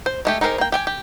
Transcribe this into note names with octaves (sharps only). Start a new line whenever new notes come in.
C5
G#3 A3 G4
D#4 G4 G#4 A#4 C5
A#3 G5
G4 G5 G#5
G4